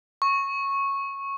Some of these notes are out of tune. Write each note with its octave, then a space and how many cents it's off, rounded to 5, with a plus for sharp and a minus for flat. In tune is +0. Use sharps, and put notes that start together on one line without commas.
C#6 -10